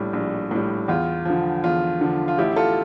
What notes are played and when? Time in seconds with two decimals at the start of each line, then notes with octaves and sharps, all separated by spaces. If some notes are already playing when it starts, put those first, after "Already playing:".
Already playing: A#1 A2 G3
0.13 A#1
0.51 A2 G3
0.88 E2 F4
1.25 D3 F3
1.64 E2 F4
2.01 D3 F3
2.28 F4
2.38 A1 E4 G4
2.56 F4 A4